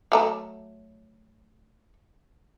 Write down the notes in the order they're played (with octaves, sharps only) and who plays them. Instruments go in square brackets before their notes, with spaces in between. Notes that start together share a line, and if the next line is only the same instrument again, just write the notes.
[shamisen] F#3 A3 A#5